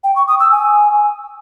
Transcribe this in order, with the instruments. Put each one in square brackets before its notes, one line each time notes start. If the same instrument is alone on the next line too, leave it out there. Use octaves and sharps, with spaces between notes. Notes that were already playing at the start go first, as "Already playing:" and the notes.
[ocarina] G5
C#6
D#6
E6
G#5